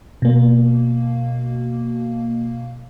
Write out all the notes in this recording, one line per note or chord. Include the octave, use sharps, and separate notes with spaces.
B2 A#3